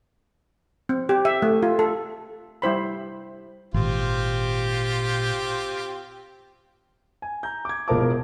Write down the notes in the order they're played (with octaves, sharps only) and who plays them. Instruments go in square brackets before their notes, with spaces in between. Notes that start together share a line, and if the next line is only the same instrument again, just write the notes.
[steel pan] C4
G4
E5
A3
F4
A4
G3 E4 C5 B5
[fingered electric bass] G#1 [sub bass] A#2 [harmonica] C4 F4 G4
[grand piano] G#5
A#5 G6
D6 G#6
E1 F3 A#4 F5 A5 D6